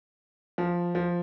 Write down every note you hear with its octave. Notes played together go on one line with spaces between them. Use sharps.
F3
F3